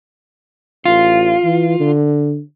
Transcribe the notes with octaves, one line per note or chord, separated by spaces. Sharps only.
A1 F4
E3
D3